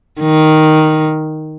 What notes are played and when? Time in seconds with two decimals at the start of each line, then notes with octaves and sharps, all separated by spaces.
0.20 D#3